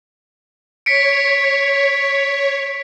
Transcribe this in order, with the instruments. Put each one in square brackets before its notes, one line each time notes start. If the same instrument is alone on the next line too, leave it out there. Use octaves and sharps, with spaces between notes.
[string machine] C#5 [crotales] B6 C#7 D7